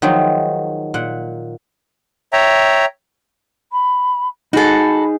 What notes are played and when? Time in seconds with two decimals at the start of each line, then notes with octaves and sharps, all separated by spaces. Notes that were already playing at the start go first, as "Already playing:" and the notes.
0.02 D#3 F3 F#3 G#3 D#4
0.94 A#2 F#5
2.33 C#5 E5 G5 A#5
3.72 B5
4.53 D#4 F#4 G#4 A4 B5